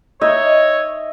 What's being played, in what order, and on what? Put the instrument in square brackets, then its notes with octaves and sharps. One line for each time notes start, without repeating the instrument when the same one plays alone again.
[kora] D#4 [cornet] C#5 [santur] D#5 E5